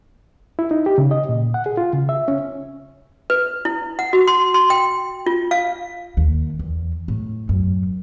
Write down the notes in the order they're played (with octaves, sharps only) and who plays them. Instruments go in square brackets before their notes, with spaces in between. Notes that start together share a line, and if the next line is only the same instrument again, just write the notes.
[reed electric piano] E4
D#4
G4
C#3
D#5
A#2
F#5
G#4
F4
C#3
E5
C#4
[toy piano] B4
E4
F#5
F#4
C6
C6
G5
F4
F5
[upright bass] D#2
E2
A2
F#2